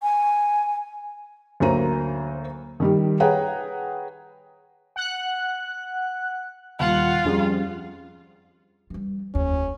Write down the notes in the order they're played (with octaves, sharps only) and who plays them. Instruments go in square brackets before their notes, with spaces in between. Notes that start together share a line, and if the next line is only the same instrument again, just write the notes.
[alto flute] G#5
[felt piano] D2 F#3 A#3 C5 A#5 D#7
D#3 G3 G4
G#4 B4 C#5 F#5 G5 A#5
[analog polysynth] F#5 F#6
[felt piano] D#1 [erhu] F4 [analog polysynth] F#5
[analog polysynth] F2 [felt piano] G3 C#4 G#4
[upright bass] E3 G3
[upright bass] F1 D#2 [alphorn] C#4